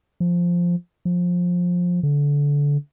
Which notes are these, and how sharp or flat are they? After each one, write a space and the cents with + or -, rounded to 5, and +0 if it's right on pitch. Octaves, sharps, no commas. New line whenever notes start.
F3 +0
F3 +20
D3 -25